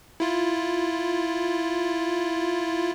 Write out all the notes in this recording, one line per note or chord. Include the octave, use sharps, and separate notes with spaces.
E4 F4